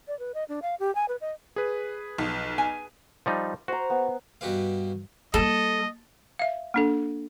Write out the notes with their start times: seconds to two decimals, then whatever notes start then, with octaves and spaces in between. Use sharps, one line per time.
0.08 D5
0.19 B4
0.34 D#5
0.49 D4
0.62 F5
0.80 G4
0.95 G#5
1.08 B4
1.21 D#5
1.56 G#4 B4
2.18 B1 F3
2.58 G#5
3.26 F3 G3 D#4
3.68 F#4 C5 A#5
3.90 B3
4.41 G2 B2 F#4 G4 B4 F5
5.34 G3 A#3 A4 D#5
6.39 E5 F5
6.74 A#3 D4 A4